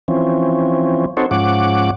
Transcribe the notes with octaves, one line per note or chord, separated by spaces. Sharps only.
E3 F3 C4 C#4
C4 D#4 F#4 A4 C5 C#5
G#2 F3 C#4 F#5 D6